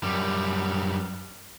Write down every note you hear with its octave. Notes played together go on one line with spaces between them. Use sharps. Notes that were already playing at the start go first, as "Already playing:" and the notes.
F#2 G3